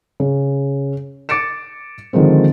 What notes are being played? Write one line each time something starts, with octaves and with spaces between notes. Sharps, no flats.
C#3
D6 A6 C#7 D7 E7
D3 D#3 F3 G#3 C4